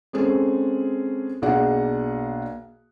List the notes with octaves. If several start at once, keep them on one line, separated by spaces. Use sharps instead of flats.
G#3 C4 C#4 G#4 A4
B1 A#3 D4 G#4 F#5